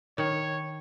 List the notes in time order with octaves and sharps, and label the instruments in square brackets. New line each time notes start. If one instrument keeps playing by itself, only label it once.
[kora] D#3 [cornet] C#5